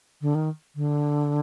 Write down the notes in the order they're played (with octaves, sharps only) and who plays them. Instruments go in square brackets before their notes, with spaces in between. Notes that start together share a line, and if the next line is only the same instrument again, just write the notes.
[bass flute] D3
D#3
D3